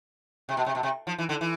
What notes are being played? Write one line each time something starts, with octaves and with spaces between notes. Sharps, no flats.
C3
B2
C3
B2
C3
F3
E3
D3
E3